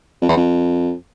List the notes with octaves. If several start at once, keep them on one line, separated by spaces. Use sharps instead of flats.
F2
E2
F2